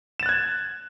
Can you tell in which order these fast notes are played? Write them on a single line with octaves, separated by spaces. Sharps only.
E7 A6 F#6 G#6